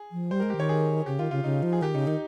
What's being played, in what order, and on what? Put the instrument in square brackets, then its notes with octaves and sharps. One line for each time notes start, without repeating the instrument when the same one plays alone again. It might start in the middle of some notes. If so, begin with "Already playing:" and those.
Already playing: [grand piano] G#4
[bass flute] F3
[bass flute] G3 [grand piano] C5
[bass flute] G#3 [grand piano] A#4
[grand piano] G4
[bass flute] D#3 [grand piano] C#5
[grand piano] G#4
[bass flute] C#3 [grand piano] G4
[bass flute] D#3 [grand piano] F4
[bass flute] C#3 [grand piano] F4
[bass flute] C#3 [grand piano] D#4
[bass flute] F3
[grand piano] G#4
[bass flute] D#3 [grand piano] G4
[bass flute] C#3 [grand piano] D#4
[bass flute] D#3 [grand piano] D#4